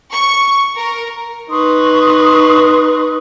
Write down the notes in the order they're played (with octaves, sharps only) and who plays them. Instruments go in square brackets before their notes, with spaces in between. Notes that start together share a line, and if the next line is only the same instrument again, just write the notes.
[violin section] C#6
A#4
[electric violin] D#4 B4 [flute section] C6 C#6 D#6